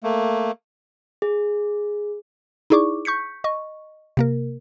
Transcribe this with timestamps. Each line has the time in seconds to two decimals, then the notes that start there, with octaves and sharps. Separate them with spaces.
0.03 A3 A#3
1.22 G#4
2.70 D#4 E4 G#4 D5 C#6 D6
3.05 C#6 G6 B6 C#7
3.44 D#5 C#6
4.17 C3 A#3 A#4